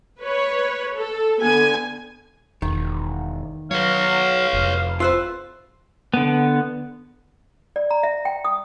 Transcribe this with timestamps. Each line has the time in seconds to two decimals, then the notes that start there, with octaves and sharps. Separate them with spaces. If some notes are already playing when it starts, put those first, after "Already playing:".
0.20 B4 C#5
0.96 A4
1.41 D3 B3 G#5
2.62 E1 D#3
3.71 F#3 B4 C#5 F5
4.53 F1
5.00 F4 B4 C5 E5
6.14 D3 B3
7.76 D5
7.91 A#5
8.03 E5
8.25 G5
8.45 D#6